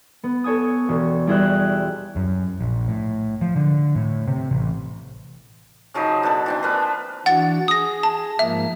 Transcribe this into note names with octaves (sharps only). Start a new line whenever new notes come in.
B3
A4 C#5 G#5 D#6
E1
G3 E4 G#4 C5 E5 F#6
F#2
A#1
A2
F3
D3
A2
C3
A1
C#3 F3 F#3 D#4
B2 D4 A4 B5
E3 C4 D4
F3 A#3 B4
E3 D4 F#4 F#5 A6
G#4 D#6 A#6
A5
G#2 F3 A#3 E5